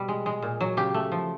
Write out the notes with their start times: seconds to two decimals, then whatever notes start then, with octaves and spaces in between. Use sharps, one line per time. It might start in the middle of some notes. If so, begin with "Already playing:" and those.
Already playing: B2 G3
0.08 G#3
0.26 G#3
0.42 A#2
0.61 F#3
0.77 C#3 G4
0.94 A3
1.12 F3